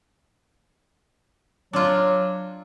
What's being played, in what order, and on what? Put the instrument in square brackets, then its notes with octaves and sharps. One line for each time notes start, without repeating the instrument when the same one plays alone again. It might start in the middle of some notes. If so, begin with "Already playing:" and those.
[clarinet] F#3 [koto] D4 F4